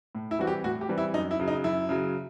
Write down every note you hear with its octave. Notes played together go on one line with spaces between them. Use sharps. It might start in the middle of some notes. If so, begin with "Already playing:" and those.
A2
E4
E3 G3 C4 F#4
G4
A2 F#4
G4
E3 G3 C4
E4
F#2 D#4
E4
C#3 F#3
D#4
F#2 E4
C#3 F#3